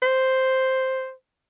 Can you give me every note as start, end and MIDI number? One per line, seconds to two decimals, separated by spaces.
0.02 1.12 72